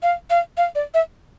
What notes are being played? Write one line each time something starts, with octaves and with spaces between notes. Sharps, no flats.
F5
F5
F5
D5
E5